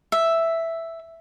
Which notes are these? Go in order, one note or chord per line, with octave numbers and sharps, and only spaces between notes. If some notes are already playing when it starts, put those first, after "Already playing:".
E5